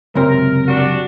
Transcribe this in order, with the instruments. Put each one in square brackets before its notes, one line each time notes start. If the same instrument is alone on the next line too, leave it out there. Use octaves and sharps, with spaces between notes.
[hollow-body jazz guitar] C#2 F#2 C3 [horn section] A#4
[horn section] G3 D4 F#4